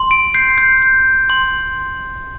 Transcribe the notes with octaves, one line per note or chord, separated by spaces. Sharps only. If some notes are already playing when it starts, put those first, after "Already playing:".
Already playing: C6
D7
G6 C7
G6
G6
C6